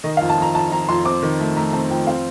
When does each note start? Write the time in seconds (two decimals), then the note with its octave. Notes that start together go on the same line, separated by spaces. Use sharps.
0.04 D#3 D#5
0.17 F5
0.21 F2
0.30 A5
0.38 F2 A#5
0.55 F2 A5
0.72 F2 A#5
0.89 F2 C6
1.05 C4 D6
1.23 D#3
1.40 A3
1.57 A3 A#5
1.73 C4 A5
1.90 F2 G5
2.07 C4 F5